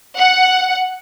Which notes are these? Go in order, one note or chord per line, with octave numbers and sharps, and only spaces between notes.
F#5